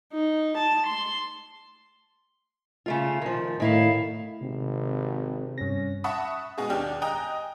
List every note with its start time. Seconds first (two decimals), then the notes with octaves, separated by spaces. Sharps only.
0.13 D#4
0.57 A5
0.86 C6
2.86 C#3 A3 F4
3.22 D#3 F3
3.60 A2 D#3 E4 F5
4.41 G#1 C3
5.58 G2 C#4 A#6
6.04 E5 F#5 A5 B5 C#6 D#6
6.58 B2 G#3 G#4
6.70 D#2 D4 G4 F6
7.02 D#5 G5 G#5 A#5 D#6 F#6